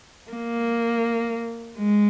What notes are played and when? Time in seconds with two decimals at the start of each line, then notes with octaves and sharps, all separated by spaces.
0.31 A#3
1.78 G#3